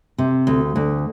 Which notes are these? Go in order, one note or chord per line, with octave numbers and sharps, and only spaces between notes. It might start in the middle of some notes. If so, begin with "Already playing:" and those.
C3
D2
D2